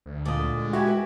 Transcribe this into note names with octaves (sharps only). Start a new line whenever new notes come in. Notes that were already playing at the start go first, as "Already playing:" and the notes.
D2
A#2 D3 A3 D5 D#5
G#3
E4 F#4 G4 G#5
B4 E5